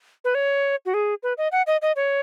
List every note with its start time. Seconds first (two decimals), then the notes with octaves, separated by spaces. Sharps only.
0.25 B4
0.35 C#5
0.86 F#4
0.94 G#4
1.23 B4
1.38 D#5
1.52 F#5
1.67 D#5
1.82 D#5
1.96 C#5